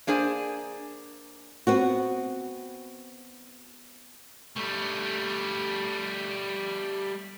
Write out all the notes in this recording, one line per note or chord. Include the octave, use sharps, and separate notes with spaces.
A#3 D4 G#4 C5 G#5
B3 C4 F#4
G3 A3